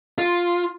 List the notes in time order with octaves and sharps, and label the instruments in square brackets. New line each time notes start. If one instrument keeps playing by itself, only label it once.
[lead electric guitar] F4